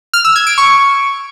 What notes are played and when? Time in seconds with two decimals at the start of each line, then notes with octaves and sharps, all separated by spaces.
0.14 F6
0.25 E6
0.36 G#6
0.47 D7
0.58 C#6